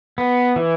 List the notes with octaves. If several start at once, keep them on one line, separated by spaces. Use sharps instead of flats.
B3
E3